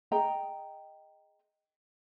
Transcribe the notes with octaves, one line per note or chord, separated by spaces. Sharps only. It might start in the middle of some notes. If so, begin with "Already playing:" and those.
G#4 D#5 G5 A#5